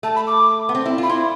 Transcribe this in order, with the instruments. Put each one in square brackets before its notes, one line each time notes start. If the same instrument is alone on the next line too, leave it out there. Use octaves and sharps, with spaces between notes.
[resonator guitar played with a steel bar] A3 [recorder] A5
[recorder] B5
D6
[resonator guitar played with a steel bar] B3
C4
E4
[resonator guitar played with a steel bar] F4 [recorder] B5
[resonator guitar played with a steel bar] E4 [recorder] C6